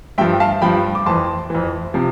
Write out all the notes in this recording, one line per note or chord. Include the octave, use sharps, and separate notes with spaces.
G2 F3 E5 G5
F5 A5
G2 F3 G5 B5
D6
F2 E3 A5 C6
F2 E3
C3 F3